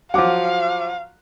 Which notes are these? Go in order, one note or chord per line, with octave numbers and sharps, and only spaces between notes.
F3 F#3 F5 F#5 D6